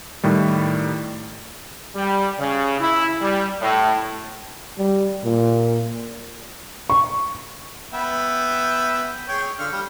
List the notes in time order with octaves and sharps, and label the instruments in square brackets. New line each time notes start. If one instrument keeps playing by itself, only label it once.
[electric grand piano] A2 D#3 G3
[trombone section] G3
C#3
E4
G3
A2
[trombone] G3
A#2
[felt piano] C#6
[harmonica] B3 E5 G5
G#4 C#5 G5
D3 F4 F6
G3